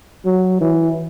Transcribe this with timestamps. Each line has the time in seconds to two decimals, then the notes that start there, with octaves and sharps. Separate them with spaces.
0.26 F#3
0.61 E3